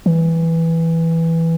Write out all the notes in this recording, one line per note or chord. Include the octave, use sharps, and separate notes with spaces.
E3